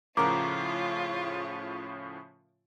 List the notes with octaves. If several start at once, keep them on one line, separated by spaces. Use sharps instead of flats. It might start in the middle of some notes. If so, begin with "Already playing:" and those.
A2 C#3 F3 F4 A#4 C#5 F#5 D6